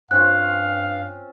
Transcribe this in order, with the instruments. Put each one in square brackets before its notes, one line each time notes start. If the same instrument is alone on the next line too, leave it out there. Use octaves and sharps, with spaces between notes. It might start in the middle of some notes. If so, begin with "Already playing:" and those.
[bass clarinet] G2 [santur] C4 C#4 F4 [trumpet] F5 [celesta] F#6